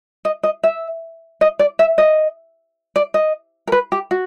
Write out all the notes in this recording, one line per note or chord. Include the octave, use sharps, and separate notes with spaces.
D#5
D#5
E5
D#5
D5
E5
D#5
D5
D#5
A#4
B4
G4
F#4